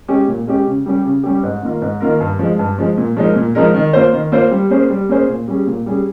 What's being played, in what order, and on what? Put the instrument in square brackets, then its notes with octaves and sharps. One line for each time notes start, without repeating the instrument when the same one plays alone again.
[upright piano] G#3 C#4 G4
A#2
G#3 C#4 G4
C#3
G3 C#4 G4
C#3
G3 C#4 G4
G#2
D#3 A#3 F4 A#4
G#2
D#3 A#3 F4 A#4
G2
F3 G#3
G2
F3 G#3
A#2
F3 G#3 D#4 A#4
A#2
F3 G#3 D#4 A#4
D#3
A#3 F4 C5
D#3
A#3 F4 C5
G3
A#3 C#4 G#4 C5
G3
A#3 C#4 G#4 C5
A#2
G3 C#4 G#4
A#2
G3 C#4 G#4